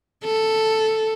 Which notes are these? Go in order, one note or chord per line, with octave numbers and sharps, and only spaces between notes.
A4